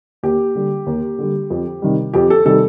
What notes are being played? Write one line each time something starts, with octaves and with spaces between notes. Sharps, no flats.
D#2 G4
D3 G3
D#2
D3 G3
F2
C3 D#3 G3
F2 G4
A4
C3 D#3 G3 A4